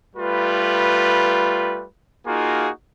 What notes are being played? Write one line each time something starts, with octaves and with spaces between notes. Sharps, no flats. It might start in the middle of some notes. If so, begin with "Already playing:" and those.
G3 A3 F4 B4
A#3 D#4 F4 F#4 G#4